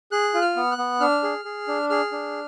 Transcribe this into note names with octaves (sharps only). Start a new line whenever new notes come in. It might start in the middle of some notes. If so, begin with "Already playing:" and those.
G#4 F#6
F4
F6
B3
F#6
B3
D4 F6
G#4
G#4
D4
G#4 F6
D4